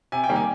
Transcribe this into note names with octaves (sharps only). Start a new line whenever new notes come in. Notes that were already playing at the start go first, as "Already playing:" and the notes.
C3 G#5
G5
D#3 G3 A#3
G#5